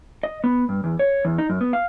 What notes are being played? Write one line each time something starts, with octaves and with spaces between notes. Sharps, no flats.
D#5
B3
G2
E2
C#5
E2
D#4
F#2
B3
F5